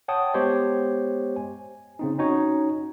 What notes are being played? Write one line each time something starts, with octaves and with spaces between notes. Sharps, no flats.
C#5 F#5 G5 A5 D#6
G#3 B3 G4 C5 C#5 D#5
G#5
C#3 C4 D#4
C#4 D#4 F#4 C#5